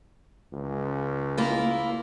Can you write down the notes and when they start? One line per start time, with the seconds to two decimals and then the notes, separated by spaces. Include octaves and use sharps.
0.53 C#2
1.38 A#3 E4 F4